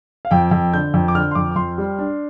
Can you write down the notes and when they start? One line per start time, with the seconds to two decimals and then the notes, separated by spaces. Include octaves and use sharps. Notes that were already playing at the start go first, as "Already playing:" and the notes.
0.25 F5
0.31 F2 G5
0.51 F2
0.73 D3 G6
0.94 F2
1.08 D6
1.15 D3 F6
1.31 C6
1.35 F2 D6
1.51 D6
1.56 F2 C6
1.78 G3
1.99 D4